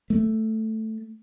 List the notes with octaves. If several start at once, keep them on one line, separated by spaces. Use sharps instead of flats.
A3